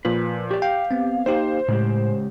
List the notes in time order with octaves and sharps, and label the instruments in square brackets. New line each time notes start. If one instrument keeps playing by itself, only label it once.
[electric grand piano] A#2 F3 [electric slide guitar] B4
[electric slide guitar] F#4 D5 [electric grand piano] G4
[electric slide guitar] F5 [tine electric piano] G5
[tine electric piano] B3 C4
[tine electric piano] A#3 D#4 G4 [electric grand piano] C5
[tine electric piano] A2 [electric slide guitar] C#3 G#3 G4